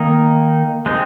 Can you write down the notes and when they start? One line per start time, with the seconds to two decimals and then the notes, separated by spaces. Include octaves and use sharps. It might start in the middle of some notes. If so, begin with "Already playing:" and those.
Already playing: D#3 A#3 D#4
0.86 G#3 C4 D#4